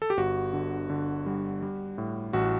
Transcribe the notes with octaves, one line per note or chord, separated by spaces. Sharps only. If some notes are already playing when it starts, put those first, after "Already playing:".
A4
G4
G1 F#4
D3
D3
G3
G3
A2
A1 F#4